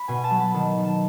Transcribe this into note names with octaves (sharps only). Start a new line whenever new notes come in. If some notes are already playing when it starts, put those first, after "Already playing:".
Already playing: B5
B2 G#5
A5
F#3
B5
D#3 A5
D#3
A5